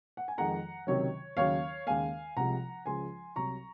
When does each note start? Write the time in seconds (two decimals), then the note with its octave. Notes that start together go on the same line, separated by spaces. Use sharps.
0.17 F#5
0.28 G#5
0.38 F2 D#3 G#3 F#5 A#5
0.87 C#2 C3 D#3 F#3 C#5
1.37 D#2 C#3 F#3 C#5 F5
1.87 D#2 C#3 G#3 F5 G#5
2.37 C2 C3 F3 G#3 F#5 A#5
2.86 C#2 C#3 F3 G#3 G#5 C6
3.36 C2 C3 F#3 A#5 C#6